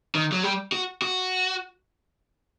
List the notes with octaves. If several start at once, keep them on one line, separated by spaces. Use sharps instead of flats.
D#3
F#3
G3
F#4
F#4